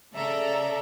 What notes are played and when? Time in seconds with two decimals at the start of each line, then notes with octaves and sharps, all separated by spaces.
0.15 C#3 A4 D5 E5 A#5